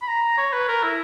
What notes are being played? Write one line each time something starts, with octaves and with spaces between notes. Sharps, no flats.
B5
A#5
C#5
B4
A#4
E4